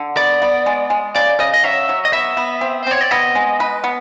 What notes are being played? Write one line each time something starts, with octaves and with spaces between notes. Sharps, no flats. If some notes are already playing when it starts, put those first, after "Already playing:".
Already playing: D3
B3 D5
B3
G#3
G#3
C#3 D5
C#3 D#5
D#5
F#3 E5
F#3
D#5
B3 E5
B3
C4
C5
C4 C#5
D5
B3 D#5
G#3
B4
B3